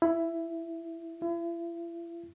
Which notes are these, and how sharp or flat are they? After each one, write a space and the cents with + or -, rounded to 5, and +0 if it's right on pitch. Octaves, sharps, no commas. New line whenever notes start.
E4 +10
E4 +40